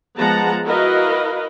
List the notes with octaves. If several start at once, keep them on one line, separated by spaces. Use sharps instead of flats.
F3 G#3 B3 F#5 A5 A#5
E4 F#4 A#4 B4 D#5 F5